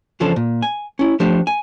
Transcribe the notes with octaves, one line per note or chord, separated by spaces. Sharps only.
E2 C#3 F3 D4 A4 C5
A#2
G#5
C#4 E4
F3 A3 D4 G4 C5
G#5